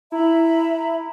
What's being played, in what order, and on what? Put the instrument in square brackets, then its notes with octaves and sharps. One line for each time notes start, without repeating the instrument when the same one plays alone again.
[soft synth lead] E4 [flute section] E5 A#5 B5